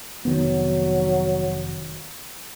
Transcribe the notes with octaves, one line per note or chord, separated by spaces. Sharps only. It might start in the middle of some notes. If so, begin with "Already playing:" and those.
F1 D#3 F#3 B3